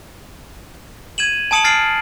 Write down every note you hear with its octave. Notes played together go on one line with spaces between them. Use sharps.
G#6 D#7 E7 F#7
G#5 A5 D#6 C#7 E7 F#7
F6 A6 C7 D7 F#7